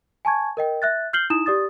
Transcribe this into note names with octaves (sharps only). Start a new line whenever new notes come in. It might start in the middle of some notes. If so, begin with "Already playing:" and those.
G#5 A5 C#6 G#6
A#4 D#5 G5
E5 F#6 A6
F6 G6 C7 F#7 G7
D#4 E4 D#6 E7
G4 D5 D#6 A6